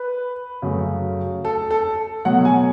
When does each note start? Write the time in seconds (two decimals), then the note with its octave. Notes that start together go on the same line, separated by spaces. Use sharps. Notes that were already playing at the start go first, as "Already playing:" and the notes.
Already playing: B4
0.62 F#2 C#3 F#3 A3
1.45 A4
1.71 A4
2.25 B2 F#3 A3 F#5
2.45 G#5